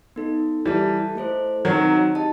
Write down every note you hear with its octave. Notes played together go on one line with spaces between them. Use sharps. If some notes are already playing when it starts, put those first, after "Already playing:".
B3 D#4 A4
E3 G3 E4 A4 E5 A5
A3 E4 A4 C5
D#3 F#3 C4 D#4 F#4
D#4 G4 D#5 A5